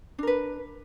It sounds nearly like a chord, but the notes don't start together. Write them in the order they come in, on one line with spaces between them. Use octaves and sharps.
D4 A#4 B4